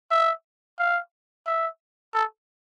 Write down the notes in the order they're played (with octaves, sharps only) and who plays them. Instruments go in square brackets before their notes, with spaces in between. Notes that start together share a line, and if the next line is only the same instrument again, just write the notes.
[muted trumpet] E5
F5
E5
A4